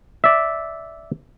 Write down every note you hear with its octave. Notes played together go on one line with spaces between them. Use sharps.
D5 E5